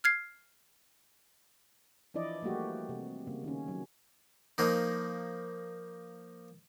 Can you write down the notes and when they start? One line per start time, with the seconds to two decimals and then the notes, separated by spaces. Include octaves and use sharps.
0.04 F6 G#6 C7
2.14 E3 F3 D4 E4 D5 D#5
2.42 F3 G3 A3 A#3 F#4 G4
2.89 C3
3.27 C#3 G3 A#3
3.44 D#3 C#4
3.68 F#3
4.58 F3 A#3 D#4